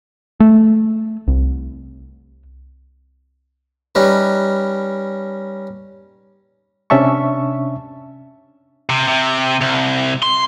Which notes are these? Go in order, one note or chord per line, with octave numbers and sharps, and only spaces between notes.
A3
C2
G3 C#4 D#4 B4
C3 C#4 D4 E5 A5 C#6
C3
C3
C2
C6